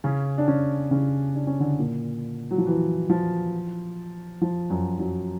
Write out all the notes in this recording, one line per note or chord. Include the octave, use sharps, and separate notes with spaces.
C#3 C#4
D4
C#3 C#4
C#3 C#4
D4
C#4
D3 D4
A#2 A#3
F#3
F3
E3
F3
F3
F#2 F#3
F#2 F#3